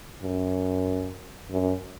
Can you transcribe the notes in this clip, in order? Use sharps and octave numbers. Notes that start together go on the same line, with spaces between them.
F#2
F#2